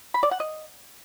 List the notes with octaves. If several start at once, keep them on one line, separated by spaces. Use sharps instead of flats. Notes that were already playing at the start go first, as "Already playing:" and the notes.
B5
D5
F#5
D#5